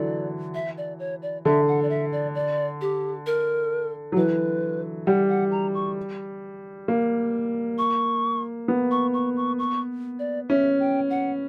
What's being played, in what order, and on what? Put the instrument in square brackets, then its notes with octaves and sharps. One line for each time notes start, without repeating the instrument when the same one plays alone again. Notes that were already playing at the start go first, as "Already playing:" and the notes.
Already playing: [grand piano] D3 E3 F#3 [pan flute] D5
[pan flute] E5
D5
C#5
D5
[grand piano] D3 [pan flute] E5
[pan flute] F#5
D5
E5
D5
D5
G4
A#4
[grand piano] F#3
[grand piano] E3 [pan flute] B4
[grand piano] G3 [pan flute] F#5
[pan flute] F#5
A#5
C#6
[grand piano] A#3
[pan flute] C#6
[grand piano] B3
[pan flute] C#6
C#6
C#6
C#6
D5
[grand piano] C#4 [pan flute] E5
[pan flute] G5
F#5